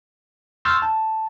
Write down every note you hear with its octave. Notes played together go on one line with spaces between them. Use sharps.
C6 C#6 E6 F6 G6 A6
A5